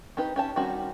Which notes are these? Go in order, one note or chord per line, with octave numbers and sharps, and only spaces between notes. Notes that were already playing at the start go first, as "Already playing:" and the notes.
C4 D#4 G4 B4
C#4 G4 A5
D#3 G3 C4 C#4 F#4